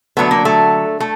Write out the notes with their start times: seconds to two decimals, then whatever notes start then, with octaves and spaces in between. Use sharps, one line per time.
0.17 D3 F#3 A3 B3
0.31 A#3
0.45 A3
1.00 A3